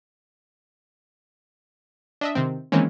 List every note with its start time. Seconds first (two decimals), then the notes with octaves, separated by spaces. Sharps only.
2.21 D4 D#5 E5
2.35 C3 D#3 C4
2.72 D#3 E3 G#3 A#3 C4 C#4